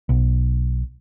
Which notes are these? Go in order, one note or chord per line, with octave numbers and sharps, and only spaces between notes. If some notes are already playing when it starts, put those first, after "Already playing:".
B1